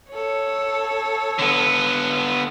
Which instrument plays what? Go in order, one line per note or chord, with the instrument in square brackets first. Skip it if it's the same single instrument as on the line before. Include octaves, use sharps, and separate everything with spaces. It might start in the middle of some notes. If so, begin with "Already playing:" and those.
[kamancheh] A4 C#5
[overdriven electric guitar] D3 B3